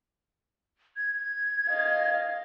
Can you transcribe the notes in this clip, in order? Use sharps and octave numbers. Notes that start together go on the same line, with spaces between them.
G#6
D#5 F5